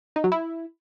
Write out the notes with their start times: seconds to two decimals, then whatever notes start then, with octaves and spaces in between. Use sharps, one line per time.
0.16 D#4
0.24 F#3
0.32 E4